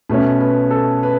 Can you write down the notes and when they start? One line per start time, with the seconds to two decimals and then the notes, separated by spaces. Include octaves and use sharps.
0.09 B2 A3 C#4 B4
0.40 B4
0.71 A4
1.03 B4